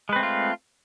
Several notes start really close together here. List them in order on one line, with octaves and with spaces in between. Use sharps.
G#3 B4 C4 A3 F4